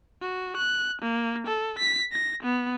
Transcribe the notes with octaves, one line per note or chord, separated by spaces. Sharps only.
F#4
F#6
A#3
A4
B6
A#6
B3